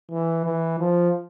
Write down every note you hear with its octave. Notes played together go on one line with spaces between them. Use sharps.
E3
E3
F3